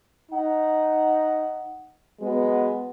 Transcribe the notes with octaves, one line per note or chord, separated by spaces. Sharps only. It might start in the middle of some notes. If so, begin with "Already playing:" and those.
D#4 F#5
F#3 G#3 B3